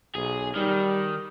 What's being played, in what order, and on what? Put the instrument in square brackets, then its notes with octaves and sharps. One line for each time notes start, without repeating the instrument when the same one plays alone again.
[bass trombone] B1 [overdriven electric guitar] G#4
[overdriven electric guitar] D#3 [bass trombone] G3